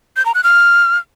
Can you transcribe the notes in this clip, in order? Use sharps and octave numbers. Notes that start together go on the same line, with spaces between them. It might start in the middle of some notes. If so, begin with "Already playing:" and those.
G6
A#5
F#6
F6